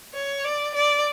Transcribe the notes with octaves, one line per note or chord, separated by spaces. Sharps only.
C#5
D5
D5